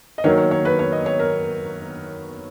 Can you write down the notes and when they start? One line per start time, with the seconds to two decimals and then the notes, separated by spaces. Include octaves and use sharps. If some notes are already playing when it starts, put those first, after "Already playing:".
0.18 D#5
0.24 D#3 F#3 A#3 C#5
0.38 C#5
0.51 C#5
0.65 B4
0.79 C#5
0.92 D#5
1.06 C#5
1.19 A#4